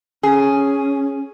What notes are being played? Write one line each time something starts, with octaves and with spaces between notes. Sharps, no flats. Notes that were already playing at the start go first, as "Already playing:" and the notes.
C#4 G#4